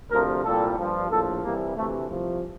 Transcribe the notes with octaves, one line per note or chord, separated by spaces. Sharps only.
D2 C3 F3 A#4
C2 A#2 G3 A4
G2 F3
A#1 A2 F3 A4
C2 C3 E3 G3 A#3
D2 C3 E3 A3
C2 C3 F3